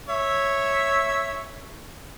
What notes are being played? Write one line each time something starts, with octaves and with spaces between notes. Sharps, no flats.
C#5 E5